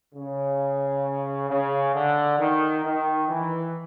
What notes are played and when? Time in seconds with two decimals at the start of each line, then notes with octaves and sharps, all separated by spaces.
0.15 C#3
1.49 C#3
1.95 D3
2.39 D#3
2.85 D#3
3.29 E3